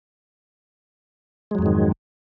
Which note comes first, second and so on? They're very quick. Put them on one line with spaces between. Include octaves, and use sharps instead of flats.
G#3 F#3 F2 G#2 D#3